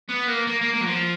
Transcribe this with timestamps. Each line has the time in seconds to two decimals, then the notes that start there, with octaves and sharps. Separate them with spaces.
0.09 B3
0.28 A#3
0.47 A#3
0.61 A#3
0.73 A#3
0.81 F#3
0.86 F3